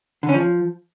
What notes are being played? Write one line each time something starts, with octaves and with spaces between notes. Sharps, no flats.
D3
C#4
F3